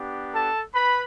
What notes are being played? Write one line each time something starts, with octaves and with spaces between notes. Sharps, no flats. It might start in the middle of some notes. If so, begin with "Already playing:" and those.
Already playing: B3 D4 G4
A4 A5
B4 B5